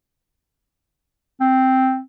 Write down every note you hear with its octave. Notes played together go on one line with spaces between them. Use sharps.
C4